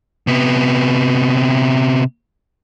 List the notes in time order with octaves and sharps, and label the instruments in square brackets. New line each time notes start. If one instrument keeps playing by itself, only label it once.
[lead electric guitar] C3 B3